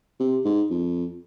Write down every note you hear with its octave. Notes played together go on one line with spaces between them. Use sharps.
C3
G#2
F2